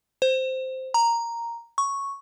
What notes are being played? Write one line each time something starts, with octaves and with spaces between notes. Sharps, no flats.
C5
A#5
C#6